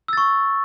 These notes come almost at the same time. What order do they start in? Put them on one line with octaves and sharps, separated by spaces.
E6 A6 C#6